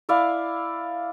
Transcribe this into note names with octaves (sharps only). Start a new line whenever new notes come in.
E4 D5 F5